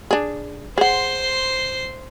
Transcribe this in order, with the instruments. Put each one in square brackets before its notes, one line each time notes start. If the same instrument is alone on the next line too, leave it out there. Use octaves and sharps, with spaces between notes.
[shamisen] D4 G#4
[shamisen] G#4 F#5 [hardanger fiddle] C5 C6